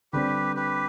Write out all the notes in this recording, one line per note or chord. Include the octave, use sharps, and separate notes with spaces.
D3 G3 C4 G4 B4
G4 B4